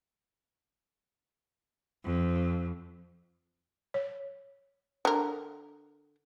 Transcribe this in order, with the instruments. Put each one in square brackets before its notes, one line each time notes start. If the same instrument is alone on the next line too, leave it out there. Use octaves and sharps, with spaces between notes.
[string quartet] F2
[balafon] C#5
[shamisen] D3 A#4